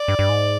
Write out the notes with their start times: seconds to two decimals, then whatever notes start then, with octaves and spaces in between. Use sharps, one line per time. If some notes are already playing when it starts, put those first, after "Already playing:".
Already playing: D5
0.08 G2
0.19 G2
0.29 G#2